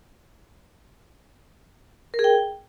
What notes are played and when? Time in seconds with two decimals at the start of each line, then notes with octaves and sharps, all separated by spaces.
2.14 A#4
2.19 G#4
2.24 G5